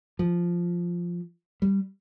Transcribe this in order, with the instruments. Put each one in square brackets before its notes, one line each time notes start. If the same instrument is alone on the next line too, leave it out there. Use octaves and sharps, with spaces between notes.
[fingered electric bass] F3
G3